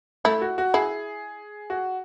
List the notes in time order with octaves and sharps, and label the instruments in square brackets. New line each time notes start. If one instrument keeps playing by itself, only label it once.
[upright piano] A3 [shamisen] E4
[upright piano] F#4
F#4
[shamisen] E4 [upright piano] G#4
[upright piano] F#4